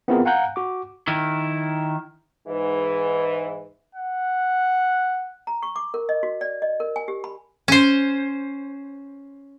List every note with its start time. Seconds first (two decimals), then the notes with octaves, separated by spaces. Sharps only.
0.08 B3 C4 E4 F4 G#4 A#4
0.25 F5 F#5 G#5 A#5 F#6 G6
0.56 F#4 D6
1.08 D#3 E4
2.47 G#2 E3
3.95 F#5
5.47 A#5
5.62 C#6
5.76 D6
5.94 A#4
6.09 D#5
6.23 F#4
6.41 D5
6.62 D#5
6.80 A#4
6.96 G#5
7.08 G4
7.24 B5
7.68 C#4 C5